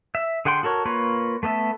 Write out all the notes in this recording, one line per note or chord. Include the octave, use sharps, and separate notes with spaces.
E5
D3 G#4 F#5 G5 C6
F#4 A4 A#4 C#5
A#3 F4 B4 C#5
A3 B3 A4 E5